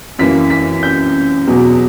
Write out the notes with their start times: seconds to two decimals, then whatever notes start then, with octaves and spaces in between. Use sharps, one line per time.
0.19 F#2 E3 A#3 B6
0.50 B6
0.83 G6
1.47 E2 B2 F#3